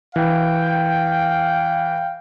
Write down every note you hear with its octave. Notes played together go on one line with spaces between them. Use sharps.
E3 F5 G5